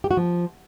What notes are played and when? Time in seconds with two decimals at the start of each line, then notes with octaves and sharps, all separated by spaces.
0.04 G4
0.11 F#4
0.17 F3